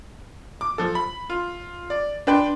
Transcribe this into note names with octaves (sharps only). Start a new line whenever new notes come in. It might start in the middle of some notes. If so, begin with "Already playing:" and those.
D6
F3 A4
B5
F4
D5
D4 B4 G5 C6